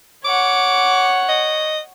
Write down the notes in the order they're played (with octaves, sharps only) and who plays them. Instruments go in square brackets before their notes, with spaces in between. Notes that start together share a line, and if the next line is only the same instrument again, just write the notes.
[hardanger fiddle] C#5 F#5 [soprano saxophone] D6
[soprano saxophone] D#5